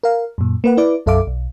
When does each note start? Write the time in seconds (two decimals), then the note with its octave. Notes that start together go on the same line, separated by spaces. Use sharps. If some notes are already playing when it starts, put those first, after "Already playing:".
0.03 A#4 F5
0.38 F#2 A#2
0.64 A#3 B4 F#5
0.77 E4 B4 D5 D6
1.06 B1 F#2 A4 E5 F5 D6
1.27 B1